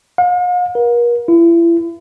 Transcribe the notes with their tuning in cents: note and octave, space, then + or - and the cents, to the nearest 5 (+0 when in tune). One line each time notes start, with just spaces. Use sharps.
F5 +45
A#4 +40
E4 +35